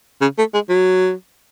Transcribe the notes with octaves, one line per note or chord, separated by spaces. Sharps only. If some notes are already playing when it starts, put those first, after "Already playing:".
C#3
A3
G#3
F#3